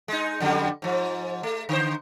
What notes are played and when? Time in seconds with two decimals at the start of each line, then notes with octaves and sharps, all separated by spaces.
0.08 G#3 D#4
0.40 F2 D3 G3
0.82 G#2 F3
1.43 A3
1.69 D3 C5